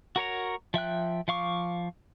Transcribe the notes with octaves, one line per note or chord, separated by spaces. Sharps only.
F#4 A#4 C#5 A#5
F3 E5 G5 F#6
F3 F5 C#6 D6